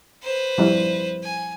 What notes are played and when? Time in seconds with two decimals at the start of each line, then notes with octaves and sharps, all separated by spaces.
0.23 B4 C5
0.58 F3 G3 E4
1.23 G#5